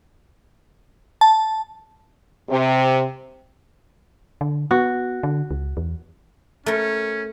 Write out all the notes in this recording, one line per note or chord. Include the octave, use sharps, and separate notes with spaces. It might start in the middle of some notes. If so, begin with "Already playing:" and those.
A5
C3
D3
B3 F#4
D3
C#2
E2
A3 C#4 A#4